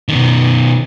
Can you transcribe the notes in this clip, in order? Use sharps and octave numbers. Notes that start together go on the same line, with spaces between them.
B2 D#3